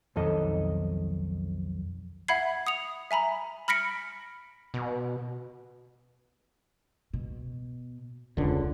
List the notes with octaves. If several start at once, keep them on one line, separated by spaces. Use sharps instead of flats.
B1 F2 D#3 A4 D#5
E5 F#5 B5 G#6 C7
D#6 C#7 F7
E5 G#5 A#5 B5
B5 F6 A#6 B6 C#7 D7
B2
B2
E1 C#2 D3